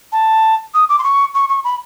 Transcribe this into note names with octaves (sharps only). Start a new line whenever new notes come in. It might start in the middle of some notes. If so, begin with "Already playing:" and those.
A5
D#6
D6
C6
C#6
C#6
C#6
B5